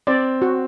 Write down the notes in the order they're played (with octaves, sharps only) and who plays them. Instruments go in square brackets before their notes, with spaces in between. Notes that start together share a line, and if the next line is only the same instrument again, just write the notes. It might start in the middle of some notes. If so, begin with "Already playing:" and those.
[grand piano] C4 [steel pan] D5
[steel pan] F#4